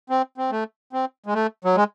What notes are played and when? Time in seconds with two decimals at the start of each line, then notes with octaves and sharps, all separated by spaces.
0.10 C4
0.38 C4
0.51 A3
0.93 C4
1.26 G#3
1.34 A3
1.64 F#3
1.76 G#3